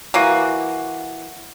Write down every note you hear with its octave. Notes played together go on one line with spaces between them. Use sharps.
E3 A#3 F#4